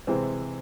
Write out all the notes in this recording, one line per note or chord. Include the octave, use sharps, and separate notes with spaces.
C3 E3 G#3 C4